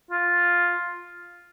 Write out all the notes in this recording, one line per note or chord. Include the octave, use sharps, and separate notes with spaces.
F4